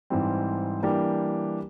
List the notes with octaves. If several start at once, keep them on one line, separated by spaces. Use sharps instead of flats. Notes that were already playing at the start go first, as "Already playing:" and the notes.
G#2 E3 G3 C4
E3 G3 A#3 D4 G4